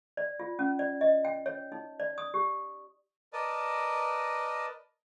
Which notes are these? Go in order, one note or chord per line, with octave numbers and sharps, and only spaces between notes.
D5
F4
C#4
D5
D#5
G5
C#5
D#4
D5
D#6
G4
A#4 B4 D5 D#5 A5